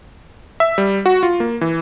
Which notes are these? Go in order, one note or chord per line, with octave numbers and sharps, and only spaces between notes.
E5
G3
F#4
F4
A#3
E3